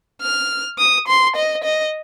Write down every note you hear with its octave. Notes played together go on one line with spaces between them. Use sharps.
F6
D#6
C6
D#5
D#5